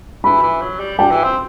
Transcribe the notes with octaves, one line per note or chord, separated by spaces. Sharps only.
E3 B5
E3
F#3
G3
G3 G5
E3
C4